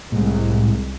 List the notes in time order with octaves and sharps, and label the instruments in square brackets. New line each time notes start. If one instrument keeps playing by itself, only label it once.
[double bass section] C2 G#3 [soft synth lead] A2